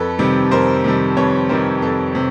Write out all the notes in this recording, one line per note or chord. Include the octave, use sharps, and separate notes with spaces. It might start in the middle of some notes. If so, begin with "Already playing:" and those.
Already playing: F2 A4 B4
C3 D#3 G3
F2 A#4 C5
C3 D#3 G3
F2 B4 C#5
C3 D#3 G3 A#4 C5
F2 A4 B4
C3